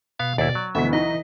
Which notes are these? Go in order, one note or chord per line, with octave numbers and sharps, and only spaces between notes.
B2 B3 F5
D#2 E4 D5
F#3
D2 B2 E3 E5 B6
D#4 D#5